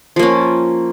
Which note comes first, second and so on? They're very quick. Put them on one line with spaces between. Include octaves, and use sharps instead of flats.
F3 A#3 C#4